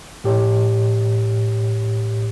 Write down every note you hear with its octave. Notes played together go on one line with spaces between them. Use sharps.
A2 G4 C#5